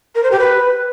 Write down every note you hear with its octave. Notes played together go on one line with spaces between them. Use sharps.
A#4
C5
G4
B4